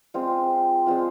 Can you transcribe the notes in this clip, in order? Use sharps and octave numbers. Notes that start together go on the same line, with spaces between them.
G#3 C4 F4
G#3 C4 F4